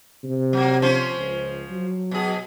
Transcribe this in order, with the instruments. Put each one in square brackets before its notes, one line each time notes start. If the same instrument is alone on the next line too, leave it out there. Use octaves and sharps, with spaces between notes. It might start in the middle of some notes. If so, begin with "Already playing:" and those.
[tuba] C3
[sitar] F#3 A#3
F3 C#4 C5
[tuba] C#2
F#3
[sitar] B2 G#4